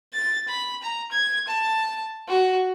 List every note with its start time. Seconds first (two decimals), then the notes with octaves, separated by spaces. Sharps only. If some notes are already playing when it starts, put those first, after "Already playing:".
0.14 A6
0.48 B5
0.82 A#5
1.12 G#6
1.48 A5
2.28 F#4